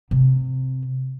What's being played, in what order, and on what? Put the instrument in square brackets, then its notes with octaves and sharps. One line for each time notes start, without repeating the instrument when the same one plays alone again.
[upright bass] C3